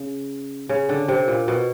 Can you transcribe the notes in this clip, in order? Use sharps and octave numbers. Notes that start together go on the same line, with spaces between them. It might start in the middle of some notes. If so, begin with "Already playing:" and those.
Already playing: C#3
C#3
D3
C3
A#2
B2